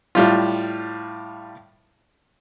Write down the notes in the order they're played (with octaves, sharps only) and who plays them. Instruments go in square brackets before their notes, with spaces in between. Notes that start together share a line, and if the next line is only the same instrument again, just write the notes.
[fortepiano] A2 G3 F4